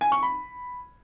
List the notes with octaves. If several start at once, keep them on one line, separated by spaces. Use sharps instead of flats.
G#5
C#6
B5